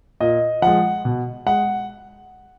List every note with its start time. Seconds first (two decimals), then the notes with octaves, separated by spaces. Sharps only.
0.20 A#2 D#5
0.62 F3 G#3 F#5
1.05 B2
1.46 G#3 F#5